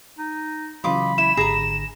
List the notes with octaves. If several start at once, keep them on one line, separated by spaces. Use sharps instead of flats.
D#4
C#3 E3 F#3 F4 D#5 B5 D6
E4 E7
G#1 D3 G#4 A#5 A#6